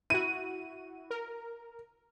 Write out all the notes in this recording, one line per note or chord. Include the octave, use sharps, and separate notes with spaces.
E4 F#4 D#7
A#4